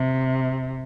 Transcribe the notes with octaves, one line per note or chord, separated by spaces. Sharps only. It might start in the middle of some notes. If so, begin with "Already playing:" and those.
Already playing: C3